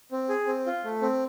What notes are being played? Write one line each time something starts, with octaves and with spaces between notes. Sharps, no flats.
C4
G#4
C4
F4
A3
C4